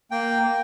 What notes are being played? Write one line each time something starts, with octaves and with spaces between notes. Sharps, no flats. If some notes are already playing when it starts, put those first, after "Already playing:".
A#3 G5
A#3